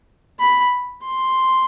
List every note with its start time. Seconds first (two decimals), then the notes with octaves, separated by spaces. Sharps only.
0.40 B5
1.05 C6